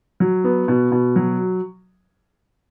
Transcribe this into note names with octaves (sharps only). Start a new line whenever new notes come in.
F#3
B3
B2
B2
F#3